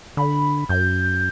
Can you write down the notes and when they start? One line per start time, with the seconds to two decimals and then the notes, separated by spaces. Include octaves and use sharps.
0.17 D3 B5
0.69 F#2 G6